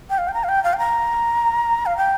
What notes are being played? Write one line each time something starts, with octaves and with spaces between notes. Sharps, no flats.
G5
F5
G5
A#5
F5
G5
F5
G5
A#5
F5
G5